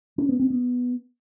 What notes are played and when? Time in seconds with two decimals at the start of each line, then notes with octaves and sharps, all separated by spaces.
0.18 C#4
0.29 B3
0.40 C4
0.50 B3